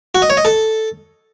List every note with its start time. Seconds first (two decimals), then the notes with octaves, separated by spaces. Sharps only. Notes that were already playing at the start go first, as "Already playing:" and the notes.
0.15 F#4
0.22 D#5
0.30 C#5
0.37 D#5
0.45 A4